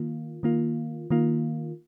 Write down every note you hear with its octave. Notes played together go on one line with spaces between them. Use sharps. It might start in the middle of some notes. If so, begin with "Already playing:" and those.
Already playing: D#3 A#3 F4
D#3 A#3 F4
D#3 A#3 F4